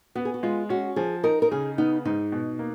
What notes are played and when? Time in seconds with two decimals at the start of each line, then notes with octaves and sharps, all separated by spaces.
0.15 B3 F#4
0.25 G#4
0.34 F#4
0.43 G#3 F4
0.69 C#4 F#4
0.96 F3 G#4
1.24 D#4 A#4
1.42 A#4
1.51 C#3 G#4
1.78 B3 D#4
2.05 G#2 D#4
2.32 B2
2.59 A#3